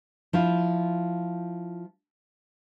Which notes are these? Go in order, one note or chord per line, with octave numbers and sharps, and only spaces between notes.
F3 E4 F4